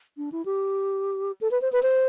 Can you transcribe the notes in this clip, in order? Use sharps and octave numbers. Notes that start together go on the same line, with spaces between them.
D4
E4
G4
A4
B4
C5
B4
C5